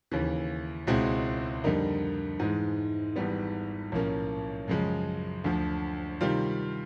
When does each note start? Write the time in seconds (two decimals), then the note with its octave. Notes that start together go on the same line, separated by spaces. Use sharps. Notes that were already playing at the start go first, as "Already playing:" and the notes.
0.11 D#2 C#3 E3
0.87 C#2 B2 G#3 C4 E4
1.64 F2 D3 G3 A#3 D#4
2.40 G#2 E3 G#3
3.16 G#1 G#2 E3 G3 B3
3.92 B1 A2 F3 A#3 C#4
4.68 F#2 C#3 F3 G#3
5.44 D2 D3 F3
6.21 C3 D#3 G3 C4 F4